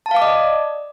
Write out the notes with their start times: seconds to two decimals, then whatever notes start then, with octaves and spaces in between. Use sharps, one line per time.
0.06 A5
0.11 F5
0.16 D6
0.22 D#5
0.27 D5